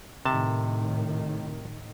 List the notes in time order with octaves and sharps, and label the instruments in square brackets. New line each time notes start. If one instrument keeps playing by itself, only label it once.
[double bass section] A2 D#3 [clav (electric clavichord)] C3 A5